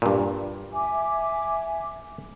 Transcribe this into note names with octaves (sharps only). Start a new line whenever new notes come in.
G2 A#2
E5 G#5 D6